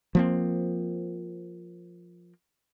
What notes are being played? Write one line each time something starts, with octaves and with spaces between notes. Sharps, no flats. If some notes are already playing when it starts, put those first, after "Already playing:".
F3 A#3 C4